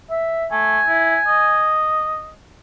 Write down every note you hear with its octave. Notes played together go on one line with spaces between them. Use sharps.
E5
A3 G#5
E4
D#5